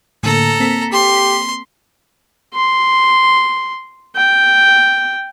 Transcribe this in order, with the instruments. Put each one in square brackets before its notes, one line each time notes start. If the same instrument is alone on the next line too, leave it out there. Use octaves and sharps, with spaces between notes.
[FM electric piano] A2 D3 A#3 [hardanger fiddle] A4 A#5
[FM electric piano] A#3 C4 B6
[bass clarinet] G4 [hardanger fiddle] C6
[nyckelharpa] C6
G5